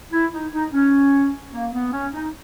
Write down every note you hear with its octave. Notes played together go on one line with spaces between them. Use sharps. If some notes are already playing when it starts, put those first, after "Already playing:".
E4
D#4
D#4
C#4
A#3
B3
C#4
D#4